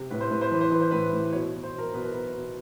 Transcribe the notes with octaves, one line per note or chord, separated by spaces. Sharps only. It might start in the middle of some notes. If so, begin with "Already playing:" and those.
Already playing: C3
A2 B4
C5
A2 B4
C5
E3 B4
C5
E3 B4
C5
A2 B4
A2
B2 C#5
B2
C5
B2
A#4
B2 B4
A#4
B2 B4
B2